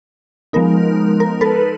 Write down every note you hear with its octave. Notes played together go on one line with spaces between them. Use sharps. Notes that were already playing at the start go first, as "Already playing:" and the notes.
F3 G#3 B3 D#4 A#4
A#4
A4 B4